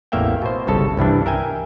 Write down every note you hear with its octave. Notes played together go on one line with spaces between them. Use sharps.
A1 E2 A#3 E5 F5 G5
B2 C5
G1 C2 C#3 A4 A5
C2 G2 E3 D4
A#4 E5 G5 G#5